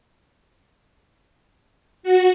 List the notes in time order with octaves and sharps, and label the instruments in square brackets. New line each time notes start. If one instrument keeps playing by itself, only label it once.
[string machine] F#4